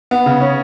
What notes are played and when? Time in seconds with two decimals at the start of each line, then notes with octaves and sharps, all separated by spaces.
0.11 B3
0.26 C#3
0.41 C#4